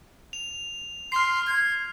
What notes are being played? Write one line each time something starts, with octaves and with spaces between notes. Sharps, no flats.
F7
C6 F6 C7
G#6